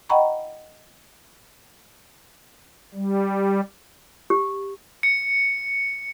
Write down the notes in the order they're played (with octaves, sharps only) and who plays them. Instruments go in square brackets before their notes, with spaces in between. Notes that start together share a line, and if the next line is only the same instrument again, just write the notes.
[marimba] D#5 F#5 G5 A#5 B5 C#6
[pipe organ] G3
[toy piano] G4
[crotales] C#7